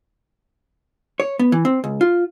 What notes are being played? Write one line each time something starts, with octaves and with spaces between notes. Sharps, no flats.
C#5
B3
E3
C4
C#2
F4